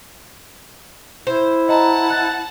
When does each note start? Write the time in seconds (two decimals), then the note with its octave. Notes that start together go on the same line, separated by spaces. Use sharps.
1.27 E4 C5
1.68 D#5 F#5 A5 A#5
2.10 F#6 A6